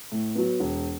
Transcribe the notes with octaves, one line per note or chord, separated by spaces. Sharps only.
A2
F#3 B3
E1